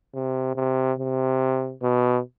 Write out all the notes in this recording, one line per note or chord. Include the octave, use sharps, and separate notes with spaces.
C3
C3
C3
B2